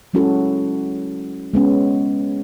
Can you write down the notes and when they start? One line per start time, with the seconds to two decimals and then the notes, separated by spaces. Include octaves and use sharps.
0.14 F#3 G#3 C#4 E4 F#4 A4
1.54 G#3 B3 C#4